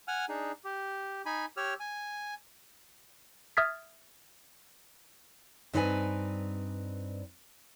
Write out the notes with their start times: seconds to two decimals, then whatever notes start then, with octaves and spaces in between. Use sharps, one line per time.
0.08 F#5 G#5 F6
0.29 D4 D#4 G#4
0.65 G4
1.26 D#4 G#5 B5
1.57 G4 C#5 E6 F6
1.80 G#5
3.57 E5 D#6 F6 G#6 A6 B6
5.73 G2 C4 D#4 B4 D5 G#5